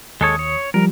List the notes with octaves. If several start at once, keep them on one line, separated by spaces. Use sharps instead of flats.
D#2 G#3 A4 C#5 D#6
C#5
F3 G3 A#4